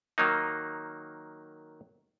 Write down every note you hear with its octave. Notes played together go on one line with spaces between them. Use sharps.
D#3 F#3 A#3 D#4